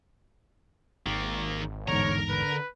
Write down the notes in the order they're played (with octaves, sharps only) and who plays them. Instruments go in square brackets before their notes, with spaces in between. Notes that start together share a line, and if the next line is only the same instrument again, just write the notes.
[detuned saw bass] G#1 [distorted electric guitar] D#3 A#3
[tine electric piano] A1 E2 G#2 [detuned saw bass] D3 [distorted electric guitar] A#4 A#5 [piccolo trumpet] C#5
[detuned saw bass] D3 [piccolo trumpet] B4